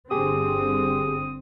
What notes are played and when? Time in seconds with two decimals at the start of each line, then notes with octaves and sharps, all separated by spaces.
0.11 G1 D3 C4 G4 G#4 D#6